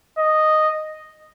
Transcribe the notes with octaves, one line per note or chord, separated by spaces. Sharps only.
D#5